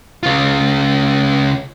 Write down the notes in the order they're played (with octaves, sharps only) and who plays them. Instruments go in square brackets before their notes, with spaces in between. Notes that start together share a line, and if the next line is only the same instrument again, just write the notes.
[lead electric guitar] C#3 F4